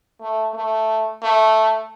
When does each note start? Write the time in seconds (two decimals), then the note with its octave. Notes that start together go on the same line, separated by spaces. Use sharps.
0.21 A3
0.54 A3
1.23 A3